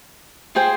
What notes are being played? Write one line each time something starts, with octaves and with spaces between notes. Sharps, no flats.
F4 G#4 C5 G5